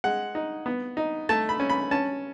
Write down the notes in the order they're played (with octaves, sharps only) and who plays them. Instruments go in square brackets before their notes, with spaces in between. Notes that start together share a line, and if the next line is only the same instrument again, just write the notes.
[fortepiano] G#3 F#5
D#4
B3
D#4
A3 A5
B5
C#4
B5
C#4 A5